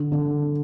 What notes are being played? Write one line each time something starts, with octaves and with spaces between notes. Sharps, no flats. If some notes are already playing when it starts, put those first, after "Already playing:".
Already playing: D3
D3